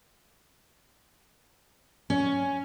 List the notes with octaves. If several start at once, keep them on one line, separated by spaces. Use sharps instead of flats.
C#4